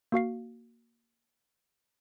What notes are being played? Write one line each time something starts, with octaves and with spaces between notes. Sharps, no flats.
A#3 F#4 F5 C7